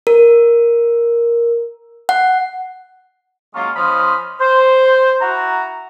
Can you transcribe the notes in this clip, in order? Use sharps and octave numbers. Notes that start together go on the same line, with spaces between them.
A#4
F#5
F#3 G#3 A#3 C#4 F4
F3 C#4 C5 D#5 B5 F6
C5
E4 F#4 F#5 A#5